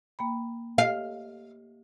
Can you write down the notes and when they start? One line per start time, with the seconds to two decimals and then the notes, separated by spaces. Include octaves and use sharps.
0.19 A#3 G5 B5
0.78 G4 D#5 F5